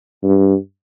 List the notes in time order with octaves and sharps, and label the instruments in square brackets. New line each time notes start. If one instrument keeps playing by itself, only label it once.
[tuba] G2